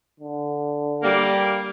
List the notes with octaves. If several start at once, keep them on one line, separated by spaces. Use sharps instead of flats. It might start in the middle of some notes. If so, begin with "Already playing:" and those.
D3
G3 A#3